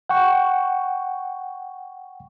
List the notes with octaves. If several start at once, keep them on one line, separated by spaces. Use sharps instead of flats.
F#5 G5 C#6